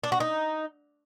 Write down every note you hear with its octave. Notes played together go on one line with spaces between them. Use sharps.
D4
F#4
D#4